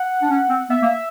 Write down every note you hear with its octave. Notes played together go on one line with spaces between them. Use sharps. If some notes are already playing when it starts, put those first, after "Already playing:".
Already playing: F#5
D4
C#4
C4
B3 E5
A#3